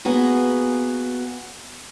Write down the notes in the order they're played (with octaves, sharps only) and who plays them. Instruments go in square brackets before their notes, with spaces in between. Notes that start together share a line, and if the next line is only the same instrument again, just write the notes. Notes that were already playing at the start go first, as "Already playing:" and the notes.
[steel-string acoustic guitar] A#3 B3 F#4 G#4